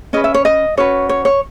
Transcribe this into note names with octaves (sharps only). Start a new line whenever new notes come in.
C#4 G#4 B4 D#5
E5
C#5
D#5
C#4 F#4 B4 C#5
C#5
C#5